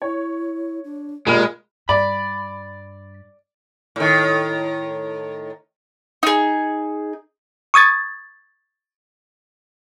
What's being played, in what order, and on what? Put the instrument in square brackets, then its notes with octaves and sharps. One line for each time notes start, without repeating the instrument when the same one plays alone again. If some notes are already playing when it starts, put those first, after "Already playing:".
[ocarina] E4 [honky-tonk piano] C#5
[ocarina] D4
[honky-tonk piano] B1 B5 F6 [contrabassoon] A#2 [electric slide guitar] G#3 [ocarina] G4
[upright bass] G2 [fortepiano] D5 [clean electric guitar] B5
[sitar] A2 D#3
[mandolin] D#4 G#4
[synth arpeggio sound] C#6 D#6 G#6 A6